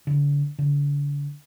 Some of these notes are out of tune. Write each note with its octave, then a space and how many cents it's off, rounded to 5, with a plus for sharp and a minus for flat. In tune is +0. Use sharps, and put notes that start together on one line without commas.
D3 -40
D3 -40